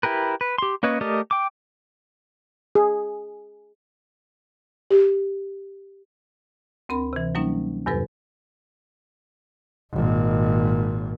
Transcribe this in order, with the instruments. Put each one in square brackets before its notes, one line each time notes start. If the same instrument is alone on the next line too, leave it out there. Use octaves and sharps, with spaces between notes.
[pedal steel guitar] E4 G4 A#4 B4
B4
G4 C6
A#3 C#4 B4 C#5 D#5
A3 G4 A#4 D5 D#5
G5 D6
[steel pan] G#4
[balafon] G4
[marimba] D2 C4 A#4 B5
C3 E3
F#3 G3 A#3 C#4 D#4
E2 G2 C3 F#3 A4 B4
[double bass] G#1 A#2